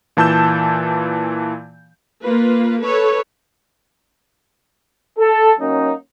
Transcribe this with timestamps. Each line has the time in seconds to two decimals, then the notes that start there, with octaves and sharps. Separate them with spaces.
0.17 A#2 E3 A5 E6 G6 E7
2.23 A#3 F4 B4
2.81 A4 B4 C#5
5.17 A4
5.59 F#3 A#3 C#4 D#4